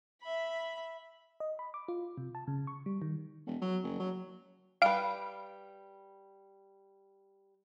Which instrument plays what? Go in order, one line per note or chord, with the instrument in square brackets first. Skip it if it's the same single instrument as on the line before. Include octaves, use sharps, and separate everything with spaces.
[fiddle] E5 B5
[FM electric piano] D#5
B5
D6
F4
C3
A5
C#3
C#6
G3
D#3
[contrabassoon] E1
F#3
F#1
F#3
[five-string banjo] G3 B4 [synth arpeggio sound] F5 D7